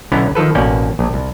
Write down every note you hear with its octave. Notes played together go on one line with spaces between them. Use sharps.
B1 D3 B3 C#4 E4 A#5
D#3 F3 A4 B4
A1 B2 A#3 C#4 D5 G5
A#1
C2